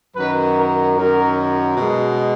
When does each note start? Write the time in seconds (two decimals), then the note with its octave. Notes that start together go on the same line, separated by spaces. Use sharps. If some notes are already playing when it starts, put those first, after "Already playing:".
0.16 F#2 D#3 F#3 B4
0.57 A#4
0.96 F#2 D#3 F#3 A#4
1.75 B2 G#3